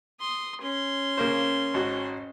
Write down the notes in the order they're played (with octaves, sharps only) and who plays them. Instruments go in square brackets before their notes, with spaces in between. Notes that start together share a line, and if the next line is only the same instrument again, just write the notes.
[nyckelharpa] C6 D#6
C#4 C6
[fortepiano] C#3 A#3 C5
G#1 F#4